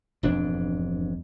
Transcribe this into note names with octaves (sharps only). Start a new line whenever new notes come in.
E1 F2 G#2 D4